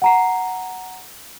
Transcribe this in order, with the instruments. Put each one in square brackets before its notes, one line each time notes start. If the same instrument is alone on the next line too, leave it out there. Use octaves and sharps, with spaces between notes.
[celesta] F#5 A#5 C7